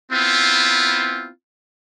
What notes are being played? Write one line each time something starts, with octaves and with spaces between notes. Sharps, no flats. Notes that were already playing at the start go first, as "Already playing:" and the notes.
B3 C4 E4 F4